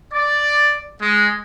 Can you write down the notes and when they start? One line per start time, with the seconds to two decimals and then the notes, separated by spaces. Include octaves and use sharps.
0.13 D5
1.01 G#3